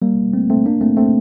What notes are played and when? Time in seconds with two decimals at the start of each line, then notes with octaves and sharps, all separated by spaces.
0.02 G3 A#3
0.33 A3 C4
0.50 A3 C4
0.66 A#3 D4
0.81 A3 C4
0.97 A3 C4